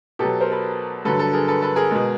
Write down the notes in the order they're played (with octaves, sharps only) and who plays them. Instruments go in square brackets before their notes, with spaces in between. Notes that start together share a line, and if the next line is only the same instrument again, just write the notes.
[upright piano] B2 F#3 G4 A4
A#4 C5
A4 B4
G2 D3 F#3 A4 B4
A4 B4
G#4 A#4
A4 B4
A4 B4
G#4 A#4
B2 G#3